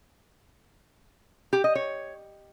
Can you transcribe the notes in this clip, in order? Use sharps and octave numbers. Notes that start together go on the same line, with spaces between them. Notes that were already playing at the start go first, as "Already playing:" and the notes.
G4
D#5
C#5